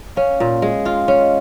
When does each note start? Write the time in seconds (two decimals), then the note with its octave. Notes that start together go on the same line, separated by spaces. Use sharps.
0.16 C#4 F5
0.40 A#2
0.62 G#3
0.85 F4 F5
1.08 C#4 C#5
1.19 D#5